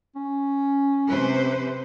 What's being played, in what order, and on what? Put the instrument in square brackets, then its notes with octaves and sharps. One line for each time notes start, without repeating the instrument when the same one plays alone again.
[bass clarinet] C#4
[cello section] C3 B4 C5